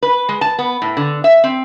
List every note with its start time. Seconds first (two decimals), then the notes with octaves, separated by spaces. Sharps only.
0.02 B4
0.29 G#3
0.41 A5
0.59 B3
0.82 A2
0.97 D3
1.24 E5
1.44 C4